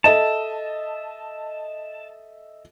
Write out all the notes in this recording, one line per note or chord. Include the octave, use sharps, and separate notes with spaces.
A4 D#5 E5 A5